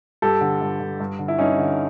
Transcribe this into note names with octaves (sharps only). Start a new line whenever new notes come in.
G2 G4 A4
D3
G2
D3
G2
D3
E4
G2 C#4 D#4
D3